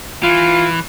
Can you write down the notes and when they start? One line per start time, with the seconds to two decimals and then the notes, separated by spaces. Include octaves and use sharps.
0.23 E3 F4